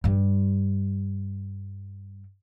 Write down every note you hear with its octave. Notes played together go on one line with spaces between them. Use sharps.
G2 G3